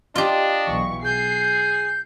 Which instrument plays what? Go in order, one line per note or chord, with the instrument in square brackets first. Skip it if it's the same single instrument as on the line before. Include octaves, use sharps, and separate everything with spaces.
[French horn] D4 [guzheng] F4 G4 [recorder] D#5
[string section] B1 E3 C#6
[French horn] G#4 [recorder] G6 [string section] C7